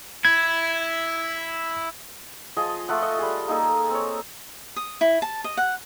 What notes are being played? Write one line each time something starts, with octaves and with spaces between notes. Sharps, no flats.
E4 G#6
F3 G#4 D#5
A3 F4 F#5
D#5
G3 G#4
A#3 D#4 G#4 A4
C4 C#5
D#6
E4
A5
D#5
F#5